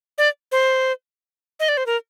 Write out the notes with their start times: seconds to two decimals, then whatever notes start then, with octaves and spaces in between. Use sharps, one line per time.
0.18 D5
0.52 C5
1.60 D#5
1.68 D5
1.77 C5
1.86 A#4